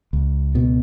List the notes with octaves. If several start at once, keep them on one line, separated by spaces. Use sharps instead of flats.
C#2
B2